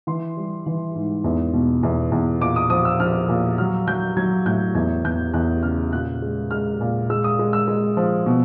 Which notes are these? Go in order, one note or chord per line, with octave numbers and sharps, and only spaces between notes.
E3 C6
G3
E3
G#2
E2
B2
E2
E2
A#2 D6
D#6
F3 D#6
E6
F3 F6
A#2
F#3 F6
F#3 G6
F#3 G#6
A2 G6
E2 G#6
E2 G6
E2 F#6
C#3 F6
A#2 F#6
G#3
G#3 F6
A#2
G#3 E6
D#6
G#3
E6
G#3
F3
B2